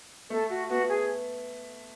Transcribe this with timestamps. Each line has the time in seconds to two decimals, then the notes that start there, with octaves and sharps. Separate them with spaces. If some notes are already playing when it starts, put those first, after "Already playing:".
0.30 A3 A4
0.50 F#4
0.69 B3 F#4
0.89 G#4